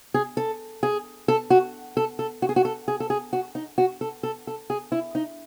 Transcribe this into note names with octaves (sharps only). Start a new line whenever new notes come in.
G#4
A4
G#4
A4
F#4
A4
A4
F#4
G#4
F#4
A4
G#4
A4
G#4
F#4
D#4
F#4
A4
A4
A4
G#4
E4
D#4